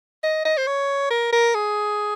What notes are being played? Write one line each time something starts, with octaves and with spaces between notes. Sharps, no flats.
D#5
D#5
C5
C#5
A#4
A#4
G#4